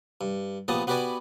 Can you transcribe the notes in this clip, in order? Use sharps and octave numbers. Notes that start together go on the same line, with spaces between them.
G2
A#1 A#2 B3 G4 A5 D#6
B3 F#4 G4 B4 D5 G#5